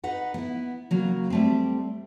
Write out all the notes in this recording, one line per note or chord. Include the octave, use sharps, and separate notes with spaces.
D#4 B4 F#5
B3 E4
C#3 F#3 A#3
G3 A3 C4